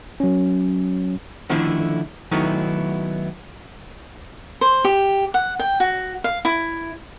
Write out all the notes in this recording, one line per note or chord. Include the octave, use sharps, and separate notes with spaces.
F#3 C#4
D3 D#3 F3 A3 D4 E4
D#3 F#3 A3 B3 D#4 E4
C5
G4
F#5
G5
F#4
F5
E4